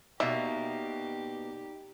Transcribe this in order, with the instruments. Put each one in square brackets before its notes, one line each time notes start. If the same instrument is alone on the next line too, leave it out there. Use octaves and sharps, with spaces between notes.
[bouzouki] B2 A#3 [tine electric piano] D#4 D5 [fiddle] G4 [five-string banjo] E5